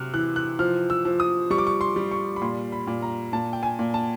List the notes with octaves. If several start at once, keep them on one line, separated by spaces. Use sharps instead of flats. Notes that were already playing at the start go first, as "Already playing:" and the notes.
Already playing: C3 F#3 F6 F#6
E3 F#6
F#6
F3 F6
E6
F3
D#6
G3 C#6
D6
C#6
C6
G3
C#6
B5
A#2 C6
B5
A#2
A#5
A#2 A5
G5
G#5
A#2
A5